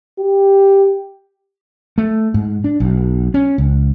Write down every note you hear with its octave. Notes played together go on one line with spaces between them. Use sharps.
G4
A3
G#2
D4
B1
C#4
C#2